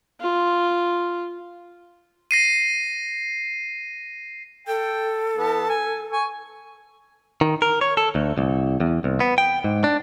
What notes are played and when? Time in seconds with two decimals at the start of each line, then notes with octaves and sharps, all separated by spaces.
0.20 F4
2.31 A#6 C7 D#7
4.68 A4 G5
5.37 E3 B3 A5
5.69 G#5
6.13 G#5 C#6
7.41 D#3
7.62 A#4
7.81 C#5
7.97 A4
8.15 D2
8.38 C2
8.80 E2
9.04 C2
9.20 B3
9.38 G5
9.64 G#2
9.84 D4